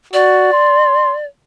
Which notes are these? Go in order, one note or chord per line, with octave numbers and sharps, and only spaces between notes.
F#4 D5
C6